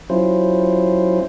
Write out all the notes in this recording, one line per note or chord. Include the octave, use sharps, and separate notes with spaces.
F#3 C#4 E4 F4 C5